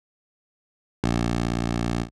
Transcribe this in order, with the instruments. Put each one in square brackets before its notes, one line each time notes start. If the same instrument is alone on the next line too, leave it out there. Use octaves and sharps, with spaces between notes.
[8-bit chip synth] A#1